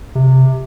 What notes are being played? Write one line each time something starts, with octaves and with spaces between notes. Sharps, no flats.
C3